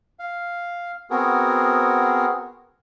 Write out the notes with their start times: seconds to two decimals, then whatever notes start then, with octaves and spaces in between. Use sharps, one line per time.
0.19 F5
1.10 B3 C4 F#4 G#4 A#4